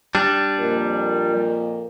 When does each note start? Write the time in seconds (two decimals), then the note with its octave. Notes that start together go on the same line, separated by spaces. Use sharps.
0.15 G3 D4
0.59 F2 A#2 A#4